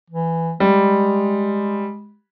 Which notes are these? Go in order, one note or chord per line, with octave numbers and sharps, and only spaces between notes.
E3
G3 G#3